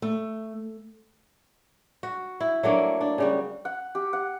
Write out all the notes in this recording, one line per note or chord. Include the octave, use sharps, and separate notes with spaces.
A3
F#4
E4
F#3 A3 A#3 D4
D4
C#3 G3 F#4
F#5
G4
F#5